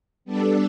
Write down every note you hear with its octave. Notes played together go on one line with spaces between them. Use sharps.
G3 B3 D4 A4 D5